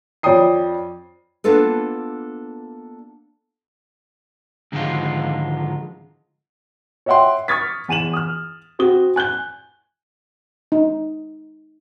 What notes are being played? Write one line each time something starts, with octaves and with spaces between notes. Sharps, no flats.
F2 C#5 D5 G5 D#6 C7
A#3 B3 D4 F4 A4 B4
G#2 D3 D#3 F3 G#3 F4
C#5 D#5 E5 F#5 G5 C6
C#6 D#6 F6 G#6 A6 B6
E2 G#5 D#7 E7 F#7
D#6 F6
C4 F#4 D#6 G7
G#5 F#6 G6 G7
D#4